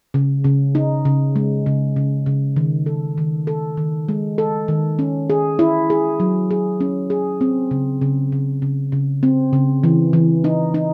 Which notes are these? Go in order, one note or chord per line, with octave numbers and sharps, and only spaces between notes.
C#3
C#3
D#4
C#3
G#3
C#3
C#3
C#3
D#3
A4
D#3
A4
D#3
G#3
A4
D#3
C#4
G#4
E4
G#4
F#3
G#4
C#4
G#4
C4
C#3
C#3
C#3
C#3
C#3
C4
C#3
E3
E3
D#4
D#4